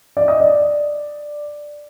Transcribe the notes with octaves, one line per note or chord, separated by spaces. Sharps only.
D5
D#5
D5